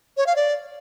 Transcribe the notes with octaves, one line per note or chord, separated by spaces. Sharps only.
C#5
F5
D5